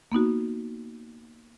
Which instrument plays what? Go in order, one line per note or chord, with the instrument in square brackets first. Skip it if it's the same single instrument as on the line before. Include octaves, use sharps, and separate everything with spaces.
[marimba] A#3 B3 D#4 F#4